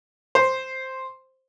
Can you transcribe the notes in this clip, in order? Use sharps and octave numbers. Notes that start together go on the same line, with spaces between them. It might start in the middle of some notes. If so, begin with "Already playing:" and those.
C5